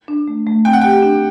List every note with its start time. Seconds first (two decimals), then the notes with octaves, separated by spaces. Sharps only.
0.08 D4
0.28 A3
0.47 A3
0.65 C4 G5
0.73 F#5
0.81 G4 G5
1.02 D4